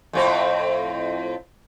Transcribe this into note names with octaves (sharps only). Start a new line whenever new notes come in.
F2 A2 C4